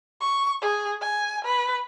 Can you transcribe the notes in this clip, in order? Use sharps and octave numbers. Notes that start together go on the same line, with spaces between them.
C#6
G#4
G#5
B4